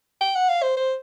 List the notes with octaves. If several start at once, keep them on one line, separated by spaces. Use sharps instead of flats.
G5
F#5
F5
C5
C5